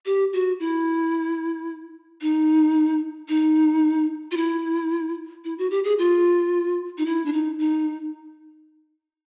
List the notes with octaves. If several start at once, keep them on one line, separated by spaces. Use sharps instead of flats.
G4
F#4
E4
D#4
D#4
F4
E4
E4
F#4
G4
G#4
F4
D#4
E4
D4
D#4
D#4